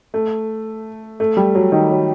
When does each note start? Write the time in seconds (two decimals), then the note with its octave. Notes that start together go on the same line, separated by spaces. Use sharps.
0.14 A3
1.20 A3
1.37 G3
1.55 F#3
1.72 D#3
1.91 F#3